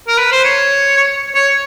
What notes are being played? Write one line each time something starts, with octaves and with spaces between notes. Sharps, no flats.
A#4
B4
C5
C#5
C#5